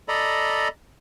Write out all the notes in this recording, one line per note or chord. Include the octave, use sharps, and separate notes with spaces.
A4 D5 D#5 A#5 B5